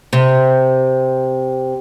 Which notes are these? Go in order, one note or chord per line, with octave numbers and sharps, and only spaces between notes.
C3